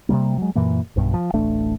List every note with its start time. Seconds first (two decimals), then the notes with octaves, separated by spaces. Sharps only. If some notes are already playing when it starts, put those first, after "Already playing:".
0.09 C3 F3 G3 A#3
0.38 F#3 G#3
0.55 F#2 A#2 E3 A#3
0.96 B1 G2 B2
1.13 F3
1.34 D1 A1 A3 D4